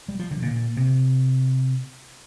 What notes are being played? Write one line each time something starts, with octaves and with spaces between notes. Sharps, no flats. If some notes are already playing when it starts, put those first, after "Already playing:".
G3
F3
D3
A#2
C3